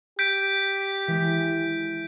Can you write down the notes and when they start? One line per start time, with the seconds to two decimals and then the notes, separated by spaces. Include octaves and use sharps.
0.19 G4 G6 B6 D7
1.08 E3 G#3